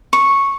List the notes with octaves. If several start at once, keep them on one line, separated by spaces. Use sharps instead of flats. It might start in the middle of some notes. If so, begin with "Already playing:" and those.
C#6